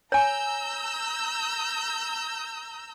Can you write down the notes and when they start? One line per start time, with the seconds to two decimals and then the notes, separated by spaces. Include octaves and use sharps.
0.12 C#5 G#5 A#5 E6 G6